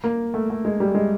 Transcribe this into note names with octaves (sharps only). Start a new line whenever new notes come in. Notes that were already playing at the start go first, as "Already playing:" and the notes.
A#3
A3
A3
G#3
G3
G#3